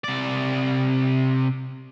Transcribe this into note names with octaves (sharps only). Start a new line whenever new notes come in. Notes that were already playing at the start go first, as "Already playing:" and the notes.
C3 D5